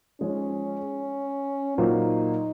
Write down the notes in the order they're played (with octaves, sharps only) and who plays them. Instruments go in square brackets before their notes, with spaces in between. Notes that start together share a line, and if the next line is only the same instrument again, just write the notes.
[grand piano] F3 G#3 D#4 G#4 [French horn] C#4
[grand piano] A#2 F#3 A#3 F4 C5 [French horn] D#4